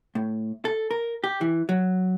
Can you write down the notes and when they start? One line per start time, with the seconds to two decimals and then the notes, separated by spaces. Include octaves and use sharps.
0.15 A2
0.65 A4
0.91 A#4
1.24 G4
1.41 E3
1.69 F#3